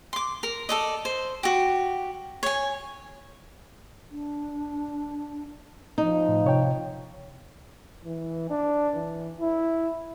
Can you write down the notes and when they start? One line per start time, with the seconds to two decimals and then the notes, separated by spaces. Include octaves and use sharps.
0.13 C6 D6
0.43 A#4
0.69 A4 D5 D#5
1.05 C5
1.43 F#4 G4
2.43 C#5 G#5
4.11 D4
5.98 F3 D#4
6.28 A2
6.44 C3 C#5 G5
8.05 E3
8.50 D4
8.95 E3
9.40 E4